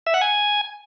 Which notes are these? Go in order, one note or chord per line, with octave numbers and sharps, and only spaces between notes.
E5
F#5
G#5